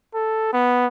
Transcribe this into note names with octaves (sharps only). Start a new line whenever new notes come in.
A4
B3